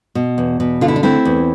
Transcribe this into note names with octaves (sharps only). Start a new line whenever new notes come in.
B2
E2
B2
D3 F4
E4
D4
A3 C4 E4
E2